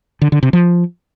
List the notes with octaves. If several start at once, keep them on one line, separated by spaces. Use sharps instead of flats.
D3
D3
C3
F3